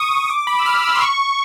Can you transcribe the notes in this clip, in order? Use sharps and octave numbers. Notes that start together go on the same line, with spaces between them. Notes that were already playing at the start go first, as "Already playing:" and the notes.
Already playing: C#6 D#6
D#6
D#6
D6
B5
E6
F6
E6
C6
C#6